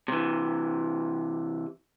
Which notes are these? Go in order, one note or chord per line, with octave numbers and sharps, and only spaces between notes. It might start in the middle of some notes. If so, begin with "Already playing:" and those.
C3 E3